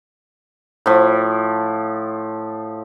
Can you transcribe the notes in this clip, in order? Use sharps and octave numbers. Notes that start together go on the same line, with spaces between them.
A2 F3